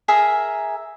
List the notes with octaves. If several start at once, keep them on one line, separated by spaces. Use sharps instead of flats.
G#4 A#4 E5